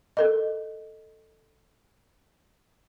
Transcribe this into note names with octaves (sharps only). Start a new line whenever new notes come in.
A4 A#4 D#5